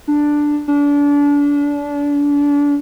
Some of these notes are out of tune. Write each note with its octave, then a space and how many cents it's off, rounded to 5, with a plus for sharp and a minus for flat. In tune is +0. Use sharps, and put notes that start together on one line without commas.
D4 +5
D4 -30